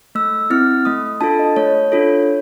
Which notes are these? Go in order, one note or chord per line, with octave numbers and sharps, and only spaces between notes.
A3 E6
C4 E4 F6
A3 D#6
D4 F4 A4 A5
D#5
A3 C#5
D4 F4 A4